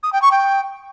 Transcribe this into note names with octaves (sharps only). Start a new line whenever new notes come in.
D#6
G5
C#6
G5